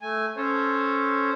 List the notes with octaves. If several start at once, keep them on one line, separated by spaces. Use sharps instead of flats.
A3 G#5
C#4 A4 C5 C#5